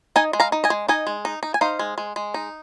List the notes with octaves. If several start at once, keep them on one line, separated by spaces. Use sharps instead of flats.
D#4 D#5 G#5
G#3
F5 A#5
D#4
D#5 G#5
G#3
D#4 D#5 G#5
G#3
D#4
D#4
G#5
D#4 C5 F5
G#3
G#3
G#3
D#4